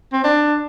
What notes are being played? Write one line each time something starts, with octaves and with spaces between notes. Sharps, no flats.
C4
D4